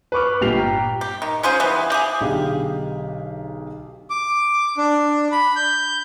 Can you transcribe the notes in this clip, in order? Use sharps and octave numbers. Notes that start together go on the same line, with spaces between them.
B4 B5 C#6 D6 F6
G1 A#2 G4 C7 F7
G5 A#5
G4
D#3
C#4 F4 G#4 C5
E3 G3 B3
G4 G#4
B1 D3 G4 G#4 F5
D6
D4
B5
G6